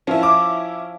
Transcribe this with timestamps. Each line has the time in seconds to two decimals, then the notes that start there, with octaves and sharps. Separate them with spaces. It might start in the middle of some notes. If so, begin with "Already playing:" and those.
0.07 F3 C#4 E4
0.23 D6